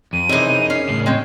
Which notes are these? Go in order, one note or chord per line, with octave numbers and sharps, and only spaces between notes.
F2 D#7
F#2 C3 E3 C4 D#4 G#4
C#4 C7
A2 C#3
G#3 C4 C#4 G5